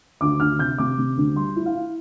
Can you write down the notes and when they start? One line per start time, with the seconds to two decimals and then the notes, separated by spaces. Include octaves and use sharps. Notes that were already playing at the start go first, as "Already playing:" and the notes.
0.21 D2 D6
0.40 D2 F6
0.59 C3 G6
0.78 C3 D6
0.98 C3
1.17 D2
1.36 G3 C6
1.56 E4
1.66 F5
1.75 E4